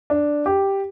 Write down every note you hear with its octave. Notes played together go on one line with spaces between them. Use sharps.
D4
G4